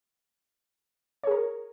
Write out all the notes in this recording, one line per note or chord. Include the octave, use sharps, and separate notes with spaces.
G#4 A#4 C#5